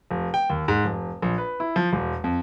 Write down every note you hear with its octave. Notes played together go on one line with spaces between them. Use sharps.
F1
G5
D#2
G#2
F1
A#1
B4
E4
F3
E1
F2